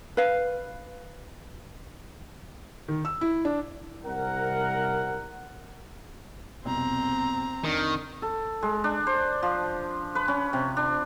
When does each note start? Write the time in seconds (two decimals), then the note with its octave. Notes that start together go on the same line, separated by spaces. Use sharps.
0.17 B4 F5
2.88 D#3
3.05 E6
3.21 E4
3.45 D4
4.03 C2 C3 A#4 F#5
6.65 C2 F2 B2 C4 A#5
7.64 F2 D#3 D4
8.22 A4
8.63 G#3
8.84 D4
9.07 C5
9.43 F3
10.15 B4
10.28 C#4
10.53 C3
10.77 D4